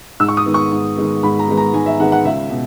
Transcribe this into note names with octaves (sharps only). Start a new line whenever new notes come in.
G#2 E6
C#6
D#6
D#3 G#3 B3
C#6
G#2
D#3 G#3 B3
G#2 B5
A#5
D#3 G#3 B3
A#5
G#2 G#5
E5
D#3 G#3 B3 F#5
F#5
C#2 E5
B2